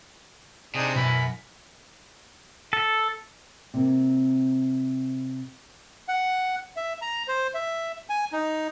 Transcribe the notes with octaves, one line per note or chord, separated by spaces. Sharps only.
C3 D4 D#4 G#4
F#2 B2 E3 B5
A4
C3 A#3 C4
F#5
E5
A#5
C5
E5
G#5
D#4